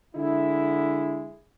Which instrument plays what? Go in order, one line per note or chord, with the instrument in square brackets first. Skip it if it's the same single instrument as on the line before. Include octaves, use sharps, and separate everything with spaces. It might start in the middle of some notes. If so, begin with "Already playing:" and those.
[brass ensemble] D3 G#3 E4